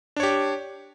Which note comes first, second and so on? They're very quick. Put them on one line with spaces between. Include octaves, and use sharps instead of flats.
D4 C#5 G4